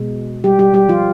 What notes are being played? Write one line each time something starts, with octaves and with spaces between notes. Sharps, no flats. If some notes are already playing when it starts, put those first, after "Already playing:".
Already playing: B2 G#3
G3 G4
G3 G4
G3 G4
F3 F4